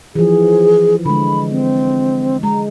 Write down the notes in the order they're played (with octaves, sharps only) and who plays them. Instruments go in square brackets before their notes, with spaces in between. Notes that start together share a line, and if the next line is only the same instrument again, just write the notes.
[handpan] E3 F3 [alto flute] G#4
[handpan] D3 G#3 [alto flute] B5
[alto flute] C4
[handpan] G#3 [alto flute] A#5